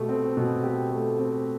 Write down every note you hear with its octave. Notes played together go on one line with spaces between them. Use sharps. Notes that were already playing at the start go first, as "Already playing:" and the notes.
Already playing: B2 A3 G4
C4
B2
G4
A3
C4